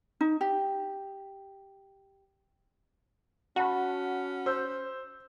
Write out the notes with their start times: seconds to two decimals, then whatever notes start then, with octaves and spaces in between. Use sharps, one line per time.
0.21 D#4
0.41 G4
3.56 C#4 F#4 F#5 A5 B5
4.46 C5 E6 G6